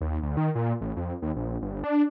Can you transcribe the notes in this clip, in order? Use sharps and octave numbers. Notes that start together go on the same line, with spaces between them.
D#2
D2
D#3
A#2
A1
F2
D#2
A#1
G1
D4